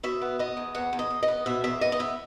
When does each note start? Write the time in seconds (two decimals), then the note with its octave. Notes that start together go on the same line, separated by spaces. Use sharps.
0.03 B2 E5
0.22 B3
0.39 B3 D#5
0.57 E2
0.75 E2 F#5
0.93 E2
0.99 D#5
1.10 E2
1.23 D#5
1.28 B3
1.46 B2 E5
1.64 E2 E5
1.81 B3 D#5
1.92 D#5
1.99 B3 E5